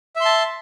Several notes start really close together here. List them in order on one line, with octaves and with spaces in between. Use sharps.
E5 C6 A5